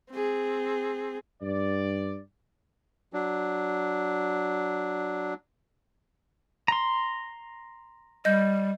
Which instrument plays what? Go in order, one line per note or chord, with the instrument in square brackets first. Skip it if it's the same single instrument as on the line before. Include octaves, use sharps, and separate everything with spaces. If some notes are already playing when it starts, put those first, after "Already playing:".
[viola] C4 G#4
[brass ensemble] G2 D5
[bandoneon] F#3 D4
[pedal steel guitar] A#5 C6
[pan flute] G3 [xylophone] D#5 G6